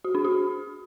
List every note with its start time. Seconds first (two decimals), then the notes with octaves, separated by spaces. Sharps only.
0.04 F#4
0.15 D4
0.25 F#4